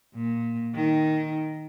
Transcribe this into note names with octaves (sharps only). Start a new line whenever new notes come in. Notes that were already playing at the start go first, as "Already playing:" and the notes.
A#2
D#3